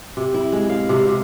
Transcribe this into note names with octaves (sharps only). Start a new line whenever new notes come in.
C3
E4
G#3
F5
C3
C3